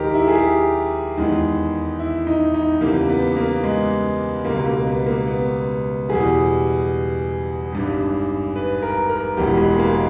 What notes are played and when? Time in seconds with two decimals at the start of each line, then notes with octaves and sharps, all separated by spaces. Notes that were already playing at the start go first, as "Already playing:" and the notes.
Already playing: D#2 D#3 G#3 D#4 G4 A#4
0.14 E4
0.28 G#4
0.35 G4
1.17 E2 D#3 G#3
1.99 E4
2.27 D#4
2.54 D#4
2.81 E2 C#3 G3 A#3
3.09 B3
3.36 A#3
3.64 G#3
4.45 C#2 B2 G3 A#3
4.66 A#3
4.87 B3
5.06 A#3
5.27 B3
6.09 E2 B2 G3 G#4
7.72 G#1 G2 G3
8.56 B4
8.83 A#4
9.09 A#4
9.37 E1 E2 B2 G#3 G4
9.57 G#3
9.78 A#3